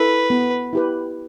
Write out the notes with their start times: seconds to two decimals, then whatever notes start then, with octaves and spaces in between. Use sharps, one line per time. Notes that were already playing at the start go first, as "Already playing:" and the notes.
Already playing: E4 A4 B4
0.30 B3
0.73 E4 G4 B4